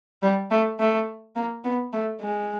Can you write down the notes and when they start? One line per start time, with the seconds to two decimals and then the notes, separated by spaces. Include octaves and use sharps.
0.23 G3
0.51 A3
0.79 A3
1.36 A#3
1.64 B3
1.93 A3
2.21 G#3